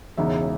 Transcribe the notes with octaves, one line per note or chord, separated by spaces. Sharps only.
E1 E2 C#3 G#3 D#4 E5